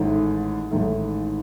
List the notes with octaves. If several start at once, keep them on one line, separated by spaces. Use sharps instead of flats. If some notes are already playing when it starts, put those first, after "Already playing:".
Already playing: A1 G#2 D#3 A3
A1 G#2 D#3 A3